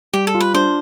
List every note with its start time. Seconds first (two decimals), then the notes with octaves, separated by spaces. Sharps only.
0.13 G3 G4
0.27 A4
0.35 F4
0.40 B4
0.54 D4 C5